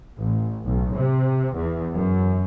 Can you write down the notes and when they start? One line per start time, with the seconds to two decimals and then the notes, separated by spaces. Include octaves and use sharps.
0.17 A1
0.64 B1
0.94 C3
1.55 E2
1.94 F#2